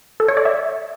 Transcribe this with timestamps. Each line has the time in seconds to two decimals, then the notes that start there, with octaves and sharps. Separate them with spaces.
0.20 A4
0.28 C#5
0.37 D5
0.45 E5